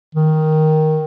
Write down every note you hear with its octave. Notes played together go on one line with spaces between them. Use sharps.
D#3